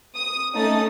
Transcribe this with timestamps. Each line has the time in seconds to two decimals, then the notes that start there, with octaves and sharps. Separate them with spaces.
0.16 D#6
0.54 A3 C#4 D#4 D#6 A6